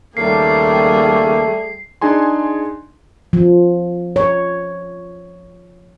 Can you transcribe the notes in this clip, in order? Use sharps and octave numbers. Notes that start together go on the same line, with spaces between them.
D#2 C#3 G3 A3 A#3 G#4 C7
D4 D#4 G#4 G#5 C6
F3
C#5